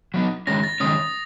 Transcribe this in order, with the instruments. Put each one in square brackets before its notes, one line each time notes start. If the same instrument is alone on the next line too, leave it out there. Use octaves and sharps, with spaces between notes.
[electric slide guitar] F#3 B3 D#4
[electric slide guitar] D#3 G#3 C#4 [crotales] A#6
[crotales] A6
[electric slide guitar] D#3 G#3 C#4 [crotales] D#6